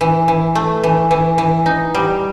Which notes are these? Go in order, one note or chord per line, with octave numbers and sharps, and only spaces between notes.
E3
E3
A3
E3
E3
E3
D#4
G3